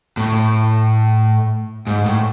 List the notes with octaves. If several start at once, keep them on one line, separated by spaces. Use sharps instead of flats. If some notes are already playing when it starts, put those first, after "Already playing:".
A2
G#2
A2